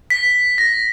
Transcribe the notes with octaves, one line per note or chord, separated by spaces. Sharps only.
B6
A#6